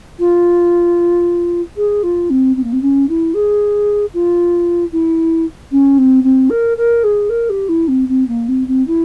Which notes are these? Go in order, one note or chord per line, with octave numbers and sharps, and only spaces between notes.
F4
G#4
F4
C4
C4
A#3
C4
C#4
E4
G#4
F4
E4
C#4
C4
C4
A#4
A#4
G#4
A#4
G4
E4
C4
C4
A#3
C4
C4
E4